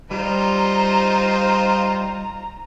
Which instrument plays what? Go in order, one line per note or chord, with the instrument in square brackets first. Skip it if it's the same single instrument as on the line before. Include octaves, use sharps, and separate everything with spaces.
[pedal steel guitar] G3 [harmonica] D#4 F4 C5 [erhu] A#5